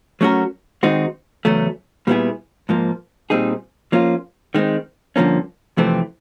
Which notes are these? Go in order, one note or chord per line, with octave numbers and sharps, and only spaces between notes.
F#3 A3 C#4 F#4 A#4
D#3 G#3 C4 D#4 F#4
E2 C#3 F#3 A3 C#4
A#2 G3 B3 E4 G#4
G#2 F3 A#3
A#2 G3 C4 D#4 G#4
F3 A#3 C#4 F4
D#3 G#3 C4
G2 D3 F3 A#3 C#4
F2 C3 E3 A3 C4